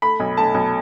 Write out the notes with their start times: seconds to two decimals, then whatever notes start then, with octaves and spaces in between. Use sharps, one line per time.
0.02 A3 B5
0.20 B1
0.37 A3 A5
0.54 B1